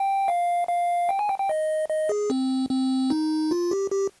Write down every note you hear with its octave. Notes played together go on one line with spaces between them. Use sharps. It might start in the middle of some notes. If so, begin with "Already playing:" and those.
Already playing: G5
F5
F5
G5
G#5
G5
G5
D#5
D#5
G#4
C4
C4
D#4
F4
G4
G4